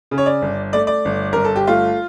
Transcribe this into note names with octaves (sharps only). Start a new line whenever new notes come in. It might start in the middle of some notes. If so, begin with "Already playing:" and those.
C#3
C#5
D5
G1
A3 D5
D5
G1
G1 A#4
A4
G4
A3 F4